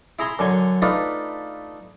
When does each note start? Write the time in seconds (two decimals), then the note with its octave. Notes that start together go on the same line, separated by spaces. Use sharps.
0.19 E4 G#4 A#5 C6
0.39 F#2 D3 G#5 C6
0.82 A3 D4 D#4 F4 B4